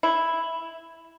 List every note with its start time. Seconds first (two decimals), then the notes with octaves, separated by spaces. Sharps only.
0.03 E4